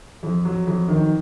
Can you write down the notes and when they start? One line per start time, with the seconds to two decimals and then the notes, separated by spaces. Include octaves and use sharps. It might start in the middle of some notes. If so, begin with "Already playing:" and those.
0.23 F2
0.45 F#3
0.67 F2
0.88 D#3